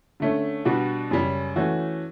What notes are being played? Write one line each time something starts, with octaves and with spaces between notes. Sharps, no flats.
D3 A3 C#4
B2 G3 D4 F#4
F#2 C#3 G3 C#4
E3 A3 C#4 F#4